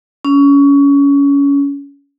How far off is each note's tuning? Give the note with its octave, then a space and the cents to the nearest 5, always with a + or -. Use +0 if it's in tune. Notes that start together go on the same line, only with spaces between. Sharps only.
C#4 +25